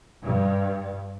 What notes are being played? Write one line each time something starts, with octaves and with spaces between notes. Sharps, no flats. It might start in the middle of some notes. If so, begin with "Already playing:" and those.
G2